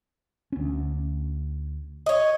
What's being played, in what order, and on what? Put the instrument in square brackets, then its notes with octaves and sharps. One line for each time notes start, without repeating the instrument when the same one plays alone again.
[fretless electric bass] D2 C#4
[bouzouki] C#5 D#5